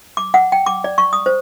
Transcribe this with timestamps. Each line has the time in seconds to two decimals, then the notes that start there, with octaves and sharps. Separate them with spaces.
0.17 D6
0.34 F#5
0.52 G5
0.66 D6
0.84 D5
0.98 C#6
1.13 D#6
1.26 C5